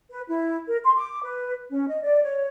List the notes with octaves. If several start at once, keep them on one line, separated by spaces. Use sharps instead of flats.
B4
E4
A#4
C6
D6
B4
C#4
D#5
D5
C#5